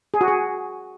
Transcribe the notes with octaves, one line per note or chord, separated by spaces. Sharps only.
G#4
F#4
G#4